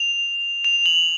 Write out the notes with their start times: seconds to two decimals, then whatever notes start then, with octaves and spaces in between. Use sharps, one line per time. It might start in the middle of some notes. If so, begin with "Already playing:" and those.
Already playing: F7
0.64 F7
0.86 F#7